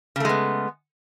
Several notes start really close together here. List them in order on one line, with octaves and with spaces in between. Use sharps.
C#3 A3 G#3 B3